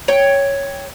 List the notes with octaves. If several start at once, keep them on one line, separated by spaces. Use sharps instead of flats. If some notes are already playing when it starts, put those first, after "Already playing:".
C#5 G5